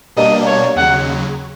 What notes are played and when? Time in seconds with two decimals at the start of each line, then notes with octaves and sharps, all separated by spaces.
0.16 B2 G3 A#3 D4 D#5
0.46 C#5
0.75 D#2 C#3 F#3 F#5